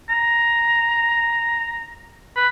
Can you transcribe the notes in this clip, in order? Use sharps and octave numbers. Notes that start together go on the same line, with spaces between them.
A#5
B4